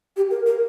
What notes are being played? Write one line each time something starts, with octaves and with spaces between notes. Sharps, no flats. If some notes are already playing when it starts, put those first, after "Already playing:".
G4
A#4
A#4